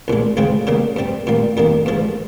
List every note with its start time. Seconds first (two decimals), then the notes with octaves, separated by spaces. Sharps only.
0.08 C2 A#2 G#3
0.37 C#2 C#3 G#3 C4 F4
0.67 C#3 G3 A#3
0.96 G2 G3 C4
1.27 A#2 G3 A#3
1.57 F2 D#3 G3 A#3
1.86 G2 F3 G#3